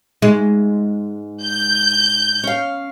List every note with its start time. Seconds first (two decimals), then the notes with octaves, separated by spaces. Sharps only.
0.22 G#2 G#3
1.42 G6
2.43 C#4 F5